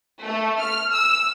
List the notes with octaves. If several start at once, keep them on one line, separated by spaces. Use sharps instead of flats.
A3
F6
E6